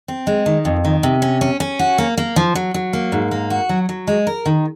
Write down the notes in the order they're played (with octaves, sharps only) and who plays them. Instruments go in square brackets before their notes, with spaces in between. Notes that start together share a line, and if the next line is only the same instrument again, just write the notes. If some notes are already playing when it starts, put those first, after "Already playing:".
[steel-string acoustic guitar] C4
G#3
D#3
F2
D#3
C3
C#4
C#4
C#4
F#4
A#3
A#3
F3
F#3
F#3
A#3
G#2
A#3
F#4
F#3
F#3
G#3
A#4
D#3